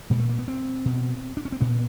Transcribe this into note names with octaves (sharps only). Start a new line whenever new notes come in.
A#2 G#3
A3
A#3
B3
C4
B2
D4
C#4
C4
A#2 B3